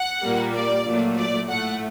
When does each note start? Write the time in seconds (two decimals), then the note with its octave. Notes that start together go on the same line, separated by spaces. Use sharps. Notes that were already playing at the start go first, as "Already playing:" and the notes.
Already playing: F#5
0.23 A#2 G3 A#3
0.54 D5
0.86 A#2 F#3 A3
1.17 D5
1.48 A2 A3 F#5